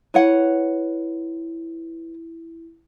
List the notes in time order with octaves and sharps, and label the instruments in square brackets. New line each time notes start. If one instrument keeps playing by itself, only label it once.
[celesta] E4 [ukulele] B4 C#5 F#5